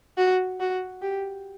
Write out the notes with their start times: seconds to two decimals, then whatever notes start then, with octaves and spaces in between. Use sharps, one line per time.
0.18 F#4
0.60 F#4
1.02 G4